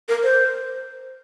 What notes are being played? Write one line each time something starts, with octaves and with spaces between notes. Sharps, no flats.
A#4
C5